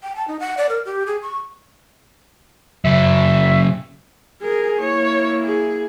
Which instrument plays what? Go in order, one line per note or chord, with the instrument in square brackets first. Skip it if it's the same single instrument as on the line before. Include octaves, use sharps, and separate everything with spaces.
[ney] G5
A5
D#4
F#5
D5
A#4
G4
G#4
C#6
[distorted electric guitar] C#3 F#3 [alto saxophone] E5
[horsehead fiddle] G#4 [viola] A#4
[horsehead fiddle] A#3 E4 [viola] C#5
[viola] G#4